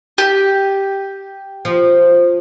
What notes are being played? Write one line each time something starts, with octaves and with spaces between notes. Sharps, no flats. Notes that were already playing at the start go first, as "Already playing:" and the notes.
G4
F3